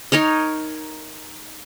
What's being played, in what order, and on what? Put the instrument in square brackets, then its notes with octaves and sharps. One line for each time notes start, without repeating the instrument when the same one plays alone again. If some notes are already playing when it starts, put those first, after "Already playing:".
[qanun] D#4 A#4 C#5 D#5